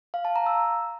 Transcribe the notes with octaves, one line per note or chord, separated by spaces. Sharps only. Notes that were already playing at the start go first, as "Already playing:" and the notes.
F5
A5
A#5
E6